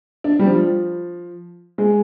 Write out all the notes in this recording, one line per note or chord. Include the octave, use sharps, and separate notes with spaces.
D4
G3
F3
G#3